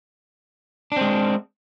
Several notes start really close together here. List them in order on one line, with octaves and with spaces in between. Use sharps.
D4 C4 G#3